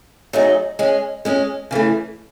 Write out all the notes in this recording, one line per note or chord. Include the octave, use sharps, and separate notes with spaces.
F#3 A3 D#4 G#4
G#3 C#4 G#4
G#3 C#4 G#4
C#3 E3 A3